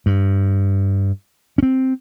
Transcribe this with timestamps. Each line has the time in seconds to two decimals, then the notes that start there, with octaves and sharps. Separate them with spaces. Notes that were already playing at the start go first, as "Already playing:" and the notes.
0.06 G2
1.58 C4 C#4